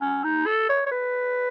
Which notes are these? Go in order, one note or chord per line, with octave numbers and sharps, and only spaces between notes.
C#4
D#4
A4
C#5
C#5
B4